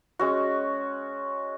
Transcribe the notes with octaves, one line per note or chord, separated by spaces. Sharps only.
G#3 C#4 F#4